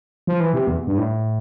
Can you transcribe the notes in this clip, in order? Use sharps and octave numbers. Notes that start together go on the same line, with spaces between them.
F3
E3
C3
E2
G2
A2